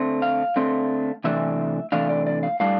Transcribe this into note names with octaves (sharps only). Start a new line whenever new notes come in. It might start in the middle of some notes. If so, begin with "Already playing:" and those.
Already playing: D3 A3 C4
F5
D3 A3 C4
C3 E3 A3 D4 E5
C3 E3 A3 D4 F5
D5
D5
F5
A2 G3 D4 F5